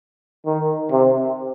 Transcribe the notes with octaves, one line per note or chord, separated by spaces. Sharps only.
D#3
C3